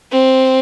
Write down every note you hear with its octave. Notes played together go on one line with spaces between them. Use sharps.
C4